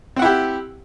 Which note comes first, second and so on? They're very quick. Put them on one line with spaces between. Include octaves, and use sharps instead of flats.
C4 F#5 E4 G4